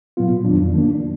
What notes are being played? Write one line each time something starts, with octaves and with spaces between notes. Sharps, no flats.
A#2 F#3 B3 F4
F2 D#3 F#3 D4
D#3 A#3 D4